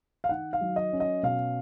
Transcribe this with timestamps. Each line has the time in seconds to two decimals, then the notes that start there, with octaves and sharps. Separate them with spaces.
0.24 F5
0.29 D#3 F#5
0.53 F5
0.61 F#3
0.76 D#5
0.93 C#4
1.00 D#5
1.23 B2 F5